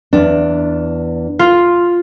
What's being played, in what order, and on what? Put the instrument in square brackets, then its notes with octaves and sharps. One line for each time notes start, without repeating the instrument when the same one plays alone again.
[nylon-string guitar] E2 D4
[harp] F4